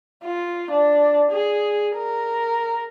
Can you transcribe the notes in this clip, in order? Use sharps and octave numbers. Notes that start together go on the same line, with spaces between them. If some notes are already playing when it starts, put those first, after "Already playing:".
F4
D4
G#4
A#4